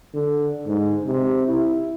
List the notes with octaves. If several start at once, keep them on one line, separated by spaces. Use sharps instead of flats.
D3
G#2
C3
E4